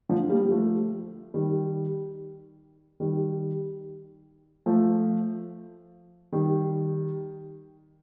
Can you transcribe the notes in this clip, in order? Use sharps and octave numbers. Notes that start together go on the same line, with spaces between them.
D3 F3
G3 A#3
F3 A3
D#3 G3
D#3 G3
F3 A3
D#3 G3